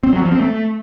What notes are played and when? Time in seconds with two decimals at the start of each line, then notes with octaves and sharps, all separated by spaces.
0.03 C4
0.13 F#3
0.22 F3
0.31 C4
0.41 A3